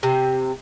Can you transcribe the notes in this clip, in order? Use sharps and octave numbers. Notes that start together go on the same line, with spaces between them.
C3